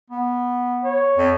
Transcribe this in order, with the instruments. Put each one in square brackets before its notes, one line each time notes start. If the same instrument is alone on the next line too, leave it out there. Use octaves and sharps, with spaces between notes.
[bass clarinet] B3
[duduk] C#5
[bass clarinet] F2